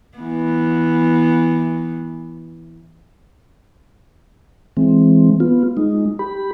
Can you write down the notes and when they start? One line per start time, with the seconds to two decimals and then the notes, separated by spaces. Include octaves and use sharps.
0.18 E3 B3
4.77 E3 G#3 C4
5.40 B3 F4
5.77 G#3 D#4
6.19 G4 B5